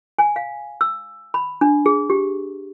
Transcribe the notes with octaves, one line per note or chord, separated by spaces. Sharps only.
G#5
F5
E6
B5
D4
G#4
G4